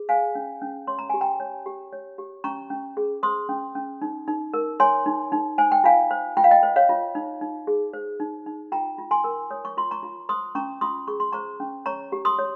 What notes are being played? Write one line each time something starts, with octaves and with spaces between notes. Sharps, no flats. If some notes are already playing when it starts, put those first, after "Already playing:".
Already playing: G#4
C5 F5 G#5
C#4
C#4
C#5 C6
A#5
G4 G#5
G5 A#5
C#5
G4
C#5
G4
C#4 A#5 C#6
C#4
G#4
C5 C6 D#6
C#4
C#4
D#4
D#4
A#4
C#5 G#5 C6
D#4
D#4
C5 G#5
G5
F4 F5 G#5
C5
F4 G5
F5
D#5 G5
C5
C#5 F5
F4
D#4
D#4
G#4
C5
D#4
D#4
F4 G5 A#5
F4
G#5 C6
A#4
C#5 D#6
C#6
F4 C6
A#5 C#6
F4
C5 C6 D#6
C#4 A#5 C#6
F4 C6 D#6
G#4 C#6
C6
C5 A#5 C#6
C#4
C#5 A#5 C#6
G4
C6 D#6
C#5